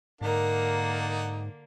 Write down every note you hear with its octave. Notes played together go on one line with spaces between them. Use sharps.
G#2 D3 A#3 D#4 A#4 F#5